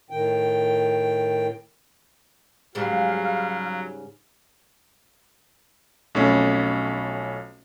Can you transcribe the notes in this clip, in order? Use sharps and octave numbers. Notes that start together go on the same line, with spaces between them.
A2 D#3 G5
G#2 C#3 F#3 G3 F5 F6
B1 F2 A3 C#4